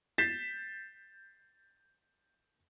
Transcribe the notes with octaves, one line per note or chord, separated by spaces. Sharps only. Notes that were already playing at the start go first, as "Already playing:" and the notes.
G6 A6 B6 C7 E7